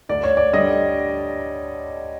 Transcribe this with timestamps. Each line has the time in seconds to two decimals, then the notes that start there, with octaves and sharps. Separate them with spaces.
0.09 D2 D5
0.24 C#5
0.37 D5
0.53 D3 G3 D#5